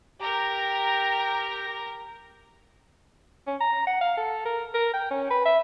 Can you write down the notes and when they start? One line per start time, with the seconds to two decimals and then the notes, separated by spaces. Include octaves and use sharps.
0.20 G4 A#4 G5 A#5
3.47 C#4
3.61 A#5
3.87 F#5
4.01 F5
4.17 A4
4.45 A#4
4.74 A#4
4.94 G5
5.11 C#4
5.30 B4
5.46 E5